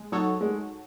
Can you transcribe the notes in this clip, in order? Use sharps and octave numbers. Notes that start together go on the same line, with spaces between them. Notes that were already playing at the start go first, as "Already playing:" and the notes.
Already playing: G#3
F#3 D#4 F#4 A4 C#5
G#3